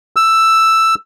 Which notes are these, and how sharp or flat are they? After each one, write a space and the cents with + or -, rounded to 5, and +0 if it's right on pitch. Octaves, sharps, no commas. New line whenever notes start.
E6 +5